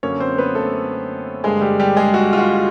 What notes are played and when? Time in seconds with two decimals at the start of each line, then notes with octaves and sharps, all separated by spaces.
0.03 F#2 D3 F#3 A#3 C#4 C#5
0.20 C4 C5
0.38 B3 B4
0.55 A3 A4
1.44 G2 D3 G3 G#3 A#3 G#4
1.61 G3 G4
1.80 G3 G4
1.96 G#3 G#4
2.14 F#4
2.33 F4
2.38 F#4